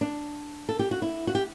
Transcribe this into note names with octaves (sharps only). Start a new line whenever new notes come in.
D4
A4
G4
F#4
E4
F#4
G4